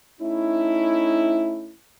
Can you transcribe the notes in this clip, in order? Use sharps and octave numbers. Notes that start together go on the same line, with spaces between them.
A3 C#4 D#4 E4